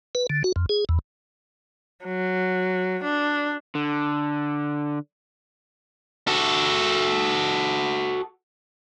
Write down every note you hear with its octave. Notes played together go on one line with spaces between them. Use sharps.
B4
D3
F#4
F2
G#4
E2
F#3
D4
D3
F#4 A4